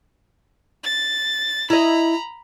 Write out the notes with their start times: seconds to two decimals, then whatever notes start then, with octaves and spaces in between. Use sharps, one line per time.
0.84 A6
1.70 E4 D#5 A#5 B5